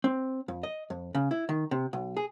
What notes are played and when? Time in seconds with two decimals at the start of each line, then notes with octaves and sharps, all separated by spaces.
0.04 C4
0.48 F2
0.63 D#5
0.90 F2
1.15 C#3
1.31 E4
1.49 D#3
1.71 C3
1.93 B1
2.17 G#4